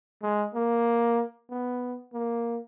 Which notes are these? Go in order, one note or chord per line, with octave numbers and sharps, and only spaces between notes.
G#3
A#3
B3
A#3